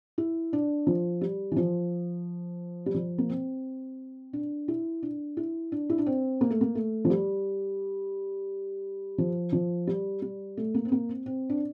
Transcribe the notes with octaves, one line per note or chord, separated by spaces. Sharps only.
E4
D4
F3
G3
E3
F3
G3
F3
A#3
C4
D4
E4
D4
E4
D4
E4
D4
C4
A#3
A3
A#3
A3
F3
G3
F3
F3
G3
G3
A3
A#3
C4
A#3
C4
C4
D4